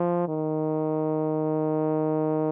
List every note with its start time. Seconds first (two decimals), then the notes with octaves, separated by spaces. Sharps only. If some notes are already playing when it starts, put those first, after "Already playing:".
Already playing: F3
0.28 D#3